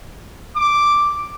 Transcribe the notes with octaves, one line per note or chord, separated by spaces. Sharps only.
D6